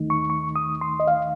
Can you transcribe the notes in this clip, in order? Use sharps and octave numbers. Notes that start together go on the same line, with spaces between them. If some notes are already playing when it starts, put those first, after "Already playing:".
Already playing: D#2 D#3 A3 D#4
C#6
C#6
D#6
C6
D#5
F5